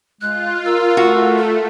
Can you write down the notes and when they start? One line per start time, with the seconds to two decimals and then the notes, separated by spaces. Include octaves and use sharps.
0.21 G#3 F4 F#6
0.65 A#4 E6
0.97 A3 F#4
1.37 A4